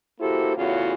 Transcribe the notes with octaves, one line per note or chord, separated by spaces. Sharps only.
A#3 E4 F#4 G4 A4 C5
E2 A2 C#3 C#4 F4 F#4